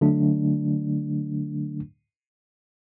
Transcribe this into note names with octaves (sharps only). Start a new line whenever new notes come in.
D3 F#3 A3 D4